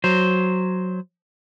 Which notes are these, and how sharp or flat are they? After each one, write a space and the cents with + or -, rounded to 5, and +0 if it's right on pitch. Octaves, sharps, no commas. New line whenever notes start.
F#3 +0 C5 +0